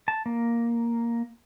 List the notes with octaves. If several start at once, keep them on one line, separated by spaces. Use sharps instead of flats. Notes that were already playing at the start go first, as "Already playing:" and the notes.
A5
A#3